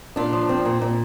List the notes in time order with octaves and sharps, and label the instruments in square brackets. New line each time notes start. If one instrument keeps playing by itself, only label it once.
[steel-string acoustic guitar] A#2 D4 F4
F3
C4
A#2
A#2